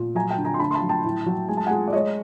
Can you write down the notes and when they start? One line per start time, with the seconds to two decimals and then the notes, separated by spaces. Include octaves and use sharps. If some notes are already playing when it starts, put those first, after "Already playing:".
Already playing: A#2
0.15 F#3 G#5 A#5
0.30 G5 A5
0.38 D3
0.45 G#5 A#5
0.54 C6
0.59 D3 A5 B5
0.71 C6
0.74 A5 B5
0.82 F#3
0.89 G5 A5
1.04 A2
1.26 F#3
1.49 G#3 G#5
1.57 A5
1.66 G#3 F#5 G#5
1.88 D5
1.93 G#3 C#5 D#5